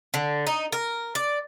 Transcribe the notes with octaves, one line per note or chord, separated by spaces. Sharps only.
D3
D#4
A#4
D5